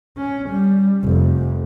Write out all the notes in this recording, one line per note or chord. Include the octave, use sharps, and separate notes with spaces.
C#4
G3
F1